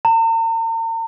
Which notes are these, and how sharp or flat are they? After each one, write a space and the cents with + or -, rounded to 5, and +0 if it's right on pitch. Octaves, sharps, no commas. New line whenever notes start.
A#5 -45